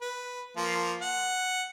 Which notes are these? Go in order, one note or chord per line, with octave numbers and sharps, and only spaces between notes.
B4
F3 A#3
F#5